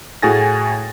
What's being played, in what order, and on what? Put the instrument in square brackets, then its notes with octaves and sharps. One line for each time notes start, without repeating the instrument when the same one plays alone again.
[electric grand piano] A2 F#4 G#4 G#5 A6 A#6